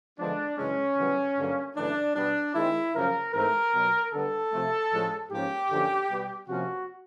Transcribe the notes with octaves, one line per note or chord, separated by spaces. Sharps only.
D3 F3 G#3 B3 D4
F#2 C#3 E3 G#3 C#4
F#2 C#3 E3 G3 B3
G2 D3 F#3 A#3
F#2 C#3 E3 A3 D4
B2 G3 B3 D4
D#3 G#3 C4 E4
F#2 C#3 F3 A#3 A#4
G#2 E3 A3 C4 A#4
B2 F#3 B3
D3 G3 B3 A4
C3 F3 A3 C4
A2 F3 G#3 C#4
G#2 F3 A#3 C#4 G4
F#2 D3 F3 A#3 C#4
B2 G3 B3
C3 F3 A#3 C#4 F#4